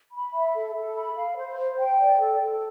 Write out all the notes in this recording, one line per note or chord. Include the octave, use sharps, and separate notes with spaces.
B5
E5
A4
A4
B5
F5
C5
C5
G5
D5
A4
A4